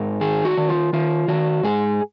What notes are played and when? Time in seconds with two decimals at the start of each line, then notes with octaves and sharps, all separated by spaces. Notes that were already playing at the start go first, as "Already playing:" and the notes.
Already playing: G#2 A#4
0.21 D#3 G#4
0.45 F#4
0.57 D#3
0.69 F4
0.93 D#3 F4
1.28 D#3 F#4
1.63 G#2 G#4